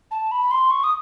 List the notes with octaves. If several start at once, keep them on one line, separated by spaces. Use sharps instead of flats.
A5
B5
C6
C#6
D#6